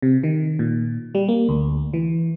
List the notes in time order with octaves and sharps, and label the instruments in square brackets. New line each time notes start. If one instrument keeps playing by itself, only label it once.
[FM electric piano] C3
D#3
A#2
G3
A#3
D2
E3